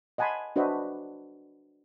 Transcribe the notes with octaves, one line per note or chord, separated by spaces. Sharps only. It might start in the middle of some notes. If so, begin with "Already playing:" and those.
D#5 F#5 G#5 A5 B5 C6
D4 F#4 B4 C5 D#5 E5